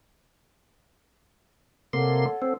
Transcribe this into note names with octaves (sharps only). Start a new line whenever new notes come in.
C3 A#3 A4 C#5 F#5 C6
C4